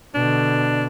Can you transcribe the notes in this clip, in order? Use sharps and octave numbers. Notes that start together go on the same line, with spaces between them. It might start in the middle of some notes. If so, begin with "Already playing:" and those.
B2 D3 D4